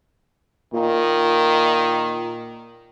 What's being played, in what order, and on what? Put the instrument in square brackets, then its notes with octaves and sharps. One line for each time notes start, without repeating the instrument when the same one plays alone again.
[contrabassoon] A#2 [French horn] D#3